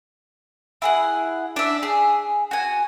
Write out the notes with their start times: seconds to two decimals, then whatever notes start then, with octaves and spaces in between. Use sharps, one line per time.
0.82 E4 G#4 F#5
1.56 D4 E5
1.83 G#4
2.51 F#4 G#5